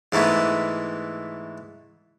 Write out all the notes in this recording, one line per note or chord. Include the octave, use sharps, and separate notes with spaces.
G#2 E3 A3 B3